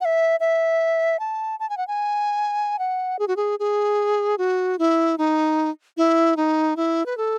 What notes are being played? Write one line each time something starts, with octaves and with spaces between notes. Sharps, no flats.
F#5
E5
E5
A5
A5
G#5
F#5
G#5
F#5
G#4
F#4
G#4
G#4
F#4
E4
D#4
E4
D#4
E4
B4
A4